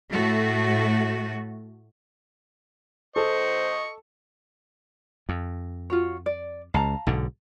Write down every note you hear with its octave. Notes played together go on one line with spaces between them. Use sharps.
A2 A3 F#4
A4 C5 D#5 C#6
F2
F4 F#4 C#5
D5
C#2 F5 A5 A#5
B1 G#2 D3